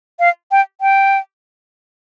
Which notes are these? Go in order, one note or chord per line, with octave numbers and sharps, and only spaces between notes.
F5
G5
G5